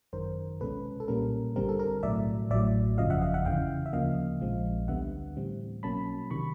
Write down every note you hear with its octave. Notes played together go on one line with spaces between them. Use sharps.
G#1 F#2 D#3 A#4 C5
C2 B2 G#3 C#4 A4 B4
A4
B1 A#2 G3 A#3 C#4 A#4
G#1 G2 D3 G3 C4 A#4
A4
A#4
B1 A2 F#3 D5 E5
A1 A2 F#3 D5 E5
G1 F2 C#3 F3 D#5 F5
E5 F#5
D#5 F5
E5 F#5
E2 C#3 E3 F5 G5
E5
D2 C#3 F3 A#3 D#5 F5
A#1 G#2 F3 G#3 C4
D2 D3 G3 B3 E5 F#5
A2 E3 G3 C4
B1 B2 F#3 A#3 C#4 A5 B5
C3 D#3 B5 C#6